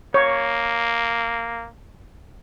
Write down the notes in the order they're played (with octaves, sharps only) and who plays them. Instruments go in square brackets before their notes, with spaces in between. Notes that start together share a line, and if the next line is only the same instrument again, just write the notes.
[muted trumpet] A#3 [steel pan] C#5